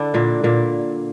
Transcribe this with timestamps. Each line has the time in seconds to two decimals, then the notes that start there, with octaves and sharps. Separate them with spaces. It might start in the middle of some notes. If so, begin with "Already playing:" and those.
Already playing: D3 D4 E4
0.14 A#2 A#3
0.44 A#2 A#3